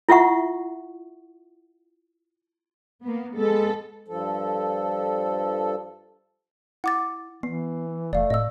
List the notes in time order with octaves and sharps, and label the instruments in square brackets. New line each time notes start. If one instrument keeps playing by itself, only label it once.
[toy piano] E4 F4 E5 F#5 C#6
[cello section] A#3 B3
[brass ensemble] G#3 [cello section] B3 A4
[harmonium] G2 F3 A4
[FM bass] E4 [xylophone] F#5 D6 A6
[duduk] E3 [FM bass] B3 [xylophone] C7
[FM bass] F1 [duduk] A3 [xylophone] D5 F5
[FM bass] A2 [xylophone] D#5 E6